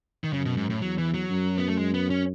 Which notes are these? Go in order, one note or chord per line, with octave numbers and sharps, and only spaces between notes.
D#3
F#2 C#3
B2
G#2
A2
E2 F#3
E3
F#3
F#2
B3
A3
G#3
B3
C#4